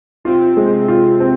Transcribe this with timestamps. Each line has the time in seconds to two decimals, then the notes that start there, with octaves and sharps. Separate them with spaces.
0.24 C3 C4 F4
0.57 G#3
0.88 F4
1.20 C4